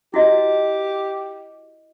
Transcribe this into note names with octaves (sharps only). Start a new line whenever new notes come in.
E4 F#4 G4 D#5